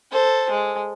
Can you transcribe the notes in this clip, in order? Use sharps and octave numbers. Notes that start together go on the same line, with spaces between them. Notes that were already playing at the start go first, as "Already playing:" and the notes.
A4 C5
G#3